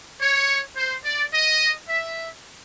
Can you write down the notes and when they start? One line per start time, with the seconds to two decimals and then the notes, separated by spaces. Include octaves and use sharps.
0.20 C#5
0.76 C5
1.04 D5
1.32 D#5
1.88 E5